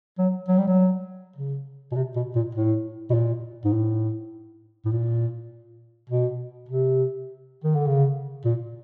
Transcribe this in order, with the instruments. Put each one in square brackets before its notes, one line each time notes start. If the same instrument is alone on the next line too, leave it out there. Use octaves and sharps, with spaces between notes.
[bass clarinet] F#3
F#3
G3
F#3
C#3
B2
C3
B2
A#2
A2
B2
A#2
G#2
A2
A2
A#2
B2
C3
D#3
D3
C#3
A#2